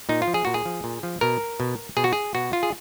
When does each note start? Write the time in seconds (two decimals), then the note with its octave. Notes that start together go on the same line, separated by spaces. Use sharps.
0.09 A#2 D#4
0.22 F4
0.28 F3
0.34 G#4
0.45 A#2 F#4
0.54 G#4
0.66 F3
0.84 A#2
1.03 F3
1.21 B2 A#4
1.60 B2
1.97 B2 G#4
2.04 F#4
2.13 G#4
2.35 B2 F#4
2.53 F4
2.63 G#4